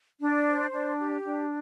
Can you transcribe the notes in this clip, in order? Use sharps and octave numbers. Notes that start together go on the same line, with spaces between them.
D4
C5
D4
G4
D4